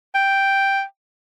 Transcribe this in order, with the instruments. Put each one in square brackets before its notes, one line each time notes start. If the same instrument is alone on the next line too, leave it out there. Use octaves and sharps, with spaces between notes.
[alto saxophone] G5